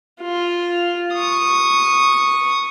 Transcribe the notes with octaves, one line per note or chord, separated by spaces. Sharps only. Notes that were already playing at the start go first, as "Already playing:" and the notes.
F4
C#6 D#6